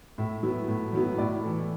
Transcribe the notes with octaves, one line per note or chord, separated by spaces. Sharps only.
A2 E5
F#3 B3 E4
A2
F#3 B3 E4
A2 D5
E3 A3